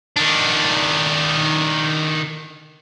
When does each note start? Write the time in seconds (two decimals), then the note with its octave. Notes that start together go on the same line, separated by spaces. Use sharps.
0.16 D#3 D4